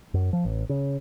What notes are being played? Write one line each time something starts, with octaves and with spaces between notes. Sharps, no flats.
F#2
F3
A1
C#3